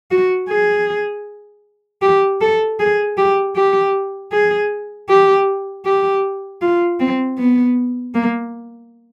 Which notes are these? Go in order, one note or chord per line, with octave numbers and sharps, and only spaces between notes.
F#4
G#4
G4
A4
G#4
G4
G4
G#4
G4
G4
F4
C4
B3
A#3